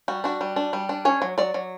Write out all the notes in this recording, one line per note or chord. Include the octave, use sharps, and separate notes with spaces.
G3 F#4
D4 F#4
G3
D4
G3
D4
C#4 C#5
F#3
F#3 D5
F#3